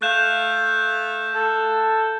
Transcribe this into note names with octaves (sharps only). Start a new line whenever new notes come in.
A3 F5 F#6 G6 E7
A4